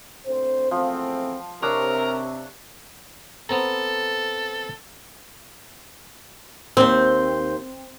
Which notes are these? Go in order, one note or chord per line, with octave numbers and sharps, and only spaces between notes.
D2 C4 C5
E2 F3 A3 C4
C3 D4 A#4 C#5 E6
B3 C4 A4 A#5
D#2 C4 C5